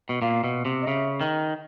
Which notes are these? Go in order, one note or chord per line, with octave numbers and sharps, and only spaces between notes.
B2
A#2 F5
B2
C3
D#5
C#3 E5
D#3